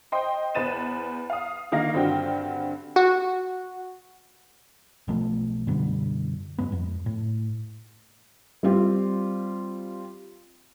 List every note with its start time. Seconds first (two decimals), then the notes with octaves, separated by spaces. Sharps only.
0.12 C5 D#5 G5 C6
0.55 E2 B4 C5 A6 D#7 E7
1.30 F5 D#6
1.72 D3 D#3 A#3 F5 A#6
1.94 G2 D3 C4 F#4 G5 F6
2.96 F#4
5.08 B1 F3 A3
5.67 F#2 B2 D3 G3
6.58 F#2 G#3 B3
6.72 F2
7.06 A2
8.63 G3 C4 F4 G4